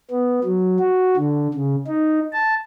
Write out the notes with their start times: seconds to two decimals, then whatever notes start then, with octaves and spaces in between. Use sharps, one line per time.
0.11 B3
0.44 F#3
0.79 F#4
1.17 D3
1.54 C#3
1.87 D#4
2.33 A5